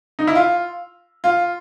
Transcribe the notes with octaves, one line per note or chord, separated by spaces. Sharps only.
D#4
E4
F4
F4